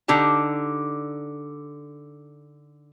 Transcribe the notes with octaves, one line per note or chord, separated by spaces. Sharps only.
D3 D#4 G4 A5